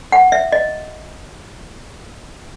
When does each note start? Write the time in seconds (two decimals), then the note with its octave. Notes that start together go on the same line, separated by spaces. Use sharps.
0.12 F#5
0.32 E5
0.52 D#5